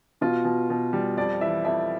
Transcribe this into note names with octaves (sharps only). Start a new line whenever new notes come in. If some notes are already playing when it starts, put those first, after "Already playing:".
B2 F4
B2
B2
G3
F2 D5
E3 E5
F2 E5